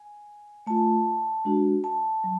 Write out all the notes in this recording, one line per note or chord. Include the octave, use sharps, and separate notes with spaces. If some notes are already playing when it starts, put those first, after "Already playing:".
Already playing: G#5
A3 F4 A5
G#3 D4 F#4
A5
F#3